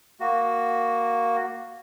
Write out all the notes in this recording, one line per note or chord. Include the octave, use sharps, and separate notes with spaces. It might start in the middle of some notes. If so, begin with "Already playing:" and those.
A#3 F#4